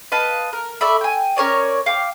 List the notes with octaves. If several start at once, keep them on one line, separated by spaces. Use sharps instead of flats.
B4 D#5 F5 A5
A#4
A3 D5 E5 B5
G5 G#5
C#4 A#4 C#5 D5
F5 G5 D6